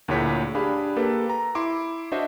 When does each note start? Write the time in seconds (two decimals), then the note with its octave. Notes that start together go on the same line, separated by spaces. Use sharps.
0.08 D2 A#2 E4 G#4 C#5 B6
0.55 D4 G4 G#4 F5 B5
0.96 A#3 G4 A4 B4
1.30 A#5
1.55 E4 C6 D6
2.12 D4 F#4 C5 D#5 E5